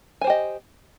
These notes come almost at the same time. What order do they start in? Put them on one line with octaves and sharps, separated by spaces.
G#5 C5 G4 D#5